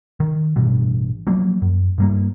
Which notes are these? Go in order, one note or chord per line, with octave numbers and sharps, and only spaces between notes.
D#3
A1 G2 B2 E3
F3 F#3 A#3
F#2
G2 G3 A#3